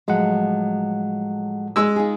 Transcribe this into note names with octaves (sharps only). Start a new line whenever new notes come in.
A2 F3 F#3 G#3 F#5
G#3 E6
D#4 F4 G#4